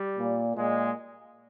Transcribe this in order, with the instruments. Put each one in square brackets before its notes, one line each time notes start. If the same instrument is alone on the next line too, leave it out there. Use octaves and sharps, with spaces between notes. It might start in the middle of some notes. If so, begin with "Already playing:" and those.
Already playing: [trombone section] G3
[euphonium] A#2
[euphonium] A#2 [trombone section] G#3